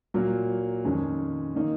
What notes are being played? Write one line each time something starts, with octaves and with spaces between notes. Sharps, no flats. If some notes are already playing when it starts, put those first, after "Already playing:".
A#2 F#3 A#3
F2 D#3 G#3 C#4 G#4
D#3 A#3 D#4